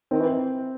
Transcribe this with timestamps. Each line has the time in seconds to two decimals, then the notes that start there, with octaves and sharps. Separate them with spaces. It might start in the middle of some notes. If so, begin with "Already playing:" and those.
0.11 D#3 C4
0.20 E3